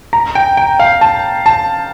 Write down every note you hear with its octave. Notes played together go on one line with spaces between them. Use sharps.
A#5
G5
G5
F5
A5
A5